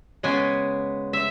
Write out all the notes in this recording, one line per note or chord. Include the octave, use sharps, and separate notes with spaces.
C#3 G#3 B3 G#5
E5